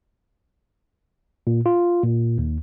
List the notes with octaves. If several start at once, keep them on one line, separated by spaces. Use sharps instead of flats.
A#2
F4
A#2
D#2